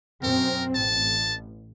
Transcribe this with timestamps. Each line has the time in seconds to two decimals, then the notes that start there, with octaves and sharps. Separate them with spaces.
0.23 F#2 B2 C4 A#4
0.75 A1 A5